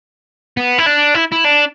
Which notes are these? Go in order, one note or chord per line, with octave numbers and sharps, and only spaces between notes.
B3
E4
D4
E4
E4
D4